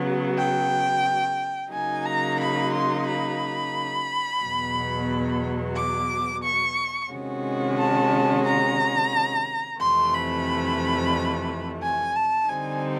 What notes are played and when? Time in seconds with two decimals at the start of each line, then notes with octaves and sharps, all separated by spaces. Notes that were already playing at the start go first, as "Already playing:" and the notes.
Already playing: C#3 F#3 B3
0.38 G5
1.73 C#3 F#3 A#3 D#4 G#5
2.06 A#5
2.40 B5
2.74 C6
3.07 B5
4.42 E2 B2 F#3
5.76 D6
6.44 C#6
7.11 C3 D#3 G#3 C#4 F#4
7.78 A5
8.45 A#5
9.80 F2 C3 E3 A3 C6
10.14 B5
11.82 G#5
12.16 A5
12.49 D3 G3 C4 D#4 G#5